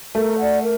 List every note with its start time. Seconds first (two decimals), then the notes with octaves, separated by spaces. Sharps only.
0.15 A3 A#4
0.38 D5 F#5
0.62 A#4